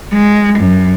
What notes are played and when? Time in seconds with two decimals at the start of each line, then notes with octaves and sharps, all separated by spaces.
0.13 G#3
0.59 F#2